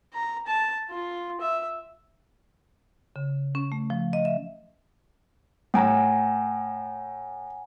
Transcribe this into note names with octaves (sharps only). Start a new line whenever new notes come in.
A#5
A5
F4
E5
C#3
C#4
A3
F3
D#5
E5
A2 F#5 G#5 A#5